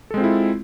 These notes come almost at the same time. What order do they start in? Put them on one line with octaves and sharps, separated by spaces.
A4 G#3 C4 F4 E4